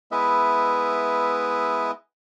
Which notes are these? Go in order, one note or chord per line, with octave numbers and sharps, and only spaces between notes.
G#3 B3 E4 B4 D#5 E5